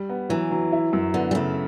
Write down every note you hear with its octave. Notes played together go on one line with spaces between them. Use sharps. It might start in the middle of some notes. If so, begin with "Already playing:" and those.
Already playing: G3
B3
E3 F#3
F#3
E4
F#2
D3 B3
G3
C#3 A3